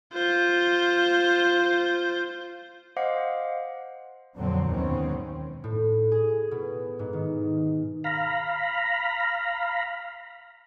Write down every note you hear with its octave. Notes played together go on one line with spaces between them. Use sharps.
F4 C5
C5 D#5 F5 F#5 D6 C7
F2 A#2 D3 F#3 C4
D#2 G#2 B2 D#3 C4 C#4
A2
G#4
B2
G#2
D#3
F5 A#5 B5